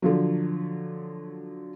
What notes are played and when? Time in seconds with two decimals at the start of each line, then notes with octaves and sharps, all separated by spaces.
0.02 D3 F3 F#3